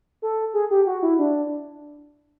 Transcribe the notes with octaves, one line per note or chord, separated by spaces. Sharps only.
A4
G#4
G4
F#4
E4
D4